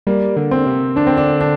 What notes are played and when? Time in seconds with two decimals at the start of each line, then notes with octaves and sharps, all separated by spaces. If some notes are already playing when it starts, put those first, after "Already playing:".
0.07 G3 A#3
0.37 D3
0.51 C4
0.66 C3
0.96 D3 D4
1.07 C4
1.17 D4
1.41 D4